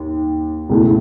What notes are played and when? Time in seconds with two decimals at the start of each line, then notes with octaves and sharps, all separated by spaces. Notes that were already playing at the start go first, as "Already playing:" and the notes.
Already playing: D#2
0.69 C#2 B2 A3 E4